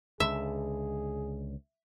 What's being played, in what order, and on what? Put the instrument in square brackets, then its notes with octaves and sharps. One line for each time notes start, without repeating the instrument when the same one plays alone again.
[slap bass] C#2 D3 [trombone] G#4 [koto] E5